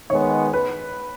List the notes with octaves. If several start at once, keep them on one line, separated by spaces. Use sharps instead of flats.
D#3 G#3 B3 C#5
B4